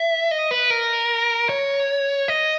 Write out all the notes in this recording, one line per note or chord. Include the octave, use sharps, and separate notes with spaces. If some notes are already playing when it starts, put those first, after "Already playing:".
Already playing: E5
D#5
B4
A#4
C#5
D#5